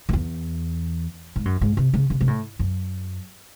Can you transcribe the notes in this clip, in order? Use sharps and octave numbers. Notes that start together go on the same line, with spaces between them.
F#2
E2
G#2
F#2
G#2
C3
C#3
C#3
C3
A2
F#2